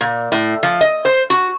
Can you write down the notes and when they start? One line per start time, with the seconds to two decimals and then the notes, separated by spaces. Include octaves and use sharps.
0.01 A#2
0.32 A2
0.63 F3
0.81 D#5
1.05 C5
1.30 F#4